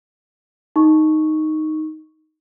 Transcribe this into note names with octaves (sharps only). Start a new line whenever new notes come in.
D#4 C#6